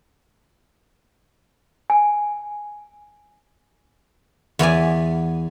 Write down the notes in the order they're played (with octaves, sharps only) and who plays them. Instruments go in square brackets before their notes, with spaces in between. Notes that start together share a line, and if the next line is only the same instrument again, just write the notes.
[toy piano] G#5
[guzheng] E2 B3 D5 G#5